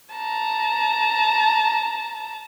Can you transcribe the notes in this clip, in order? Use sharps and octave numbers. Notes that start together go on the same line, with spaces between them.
A5 A#5